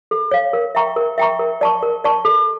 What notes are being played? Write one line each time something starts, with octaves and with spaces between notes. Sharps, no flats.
A4
C#5 F5
A#4
E5 G5 A#5 C#6
A#4
E5 G5 A#5 C#6
A#4
D5 A5 C#6
A#4
D5 A5 C#6
A4